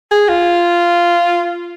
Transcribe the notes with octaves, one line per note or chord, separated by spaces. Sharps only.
G#4
F4